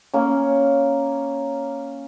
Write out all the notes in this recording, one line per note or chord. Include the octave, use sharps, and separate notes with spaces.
A#3 C#4